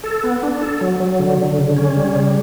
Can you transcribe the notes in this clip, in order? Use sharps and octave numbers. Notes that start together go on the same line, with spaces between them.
A4
B3
D4
A4
F#3
F#3
D3
D3
C#3
C#4
G3
C#3